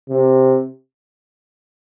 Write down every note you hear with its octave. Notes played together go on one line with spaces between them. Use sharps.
C3